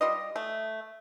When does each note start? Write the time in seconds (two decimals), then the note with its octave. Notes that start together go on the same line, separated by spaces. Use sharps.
0.01 G3 F4 D#5
0.36 A3